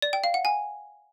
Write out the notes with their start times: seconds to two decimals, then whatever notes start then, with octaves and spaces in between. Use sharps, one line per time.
0.02 D5
0.13 G5
0.24 F5
0.34 F#5
0.45 G#5